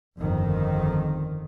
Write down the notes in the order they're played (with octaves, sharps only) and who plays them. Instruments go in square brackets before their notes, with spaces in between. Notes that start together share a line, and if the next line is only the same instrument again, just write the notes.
[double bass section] G1 F2 D#3